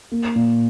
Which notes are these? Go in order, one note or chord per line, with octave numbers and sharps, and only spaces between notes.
A#3
A#2